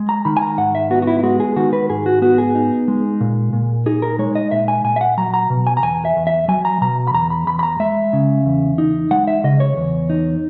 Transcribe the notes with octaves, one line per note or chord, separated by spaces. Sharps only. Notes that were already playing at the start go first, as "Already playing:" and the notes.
Already playing: G#3
A#5
D#3 B5
G#5
A#5
G#2 F#5
E5
B3 F#4
F#4
E4
E4
G#3 F#4
G#4
D#3 F#4
B4
G#2 G#4
F#4
B3 F#4
G#4
D#4
G#3
A#2
A#2
D#4 G#4
A#4
G#3 C#5
D#5
A#2 E5
G#5
A#2 G#5
E5
F#5
F#3 A#5
A#5
B2
G#5
A#5
E2 G#5
E5
E2
E5
F#3 G#5
A#5
B2 A#5
B5
E2 A#5
B5
E2 B5
B5
A#5
G#3 E5
C#3
E2
D#4
G#3 F#5
E5
C#3 D#5
C#5
E2
D#4